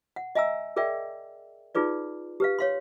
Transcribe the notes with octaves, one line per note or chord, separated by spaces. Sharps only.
F#5
D#5 E5 G#5 A#5 E6
G#4 A#4 D5 E5 G5
D#4 F4 G#4 B4 D5
G4 B4 F5
C#5 F5 C6